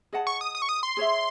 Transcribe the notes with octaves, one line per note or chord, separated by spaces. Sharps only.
G#4 D#5 F#5 A5
C#6
D#6
D#6
C#6
D#6
C6
G#4 C#5 E5